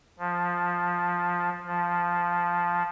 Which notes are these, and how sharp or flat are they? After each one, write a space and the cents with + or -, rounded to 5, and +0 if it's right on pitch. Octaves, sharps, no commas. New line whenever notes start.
F3 +10
F3 +0